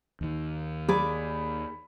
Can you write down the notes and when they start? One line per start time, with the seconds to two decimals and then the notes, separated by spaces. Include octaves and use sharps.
0.21 D#2 D#3
0.89 G#4 D5 B5